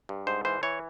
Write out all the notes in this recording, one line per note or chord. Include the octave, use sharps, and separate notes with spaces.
G2
G#2 C5
E3 C5
E3 C#5